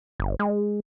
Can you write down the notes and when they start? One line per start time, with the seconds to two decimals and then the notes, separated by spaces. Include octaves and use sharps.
0.20 G1
0.39 G#3